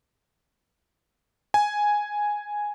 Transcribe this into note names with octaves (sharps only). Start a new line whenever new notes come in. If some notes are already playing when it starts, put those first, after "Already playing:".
G#5